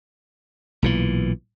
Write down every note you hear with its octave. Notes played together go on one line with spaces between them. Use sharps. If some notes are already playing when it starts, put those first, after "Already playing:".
B1 A#2 E3